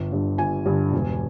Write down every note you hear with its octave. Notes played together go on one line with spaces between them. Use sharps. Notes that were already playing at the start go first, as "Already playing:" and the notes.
Already playing: G1
G2 D3
G1 G#5
G2 D3
E1